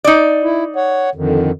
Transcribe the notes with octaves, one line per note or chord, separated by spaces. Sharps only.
D#4 D5
E4
C#5 F#5
F2 D3 D#3